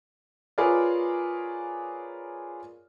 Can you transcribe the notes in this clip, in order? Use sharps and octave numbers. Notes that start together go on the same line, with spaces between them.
F4 G#4 A#4 B4 C#5 D5